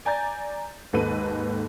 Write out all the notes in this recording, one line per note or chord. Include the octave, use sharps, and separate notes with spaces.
D5 G#5 A#5 G6 A6
D#2 G#2 A4 B4 D#7